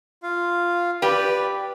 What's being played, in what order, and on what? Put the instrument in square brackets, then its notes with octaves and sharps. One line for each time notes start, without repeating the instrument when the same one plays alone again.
[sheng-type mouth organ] F4 F5
[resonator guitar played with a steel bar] G4 [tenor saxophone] B4 [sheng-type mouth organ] D5